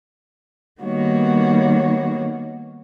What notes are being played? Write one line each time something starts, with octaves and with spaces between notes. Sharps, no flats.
D#3 G3 A#3 B3 F#4 C#5